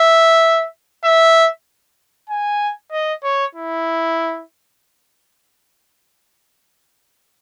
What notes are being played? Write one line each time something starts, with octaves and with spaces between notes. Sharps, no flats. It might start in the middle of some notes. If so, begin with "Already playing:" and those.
Already playing: E5
E5
G#5
D#5
C#5
E4